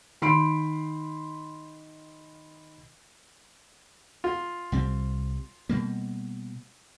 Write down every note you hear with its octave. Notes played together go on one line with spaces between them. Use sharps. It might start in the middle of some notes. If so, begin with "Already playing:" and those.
D#3 B5 C6 D7
F4
C2 G3 C4
B2 G3 A#3